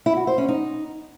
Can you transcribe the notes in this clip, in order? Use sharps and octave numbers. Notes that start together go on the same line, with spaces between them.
E4
F#4
C5
C#4
D#4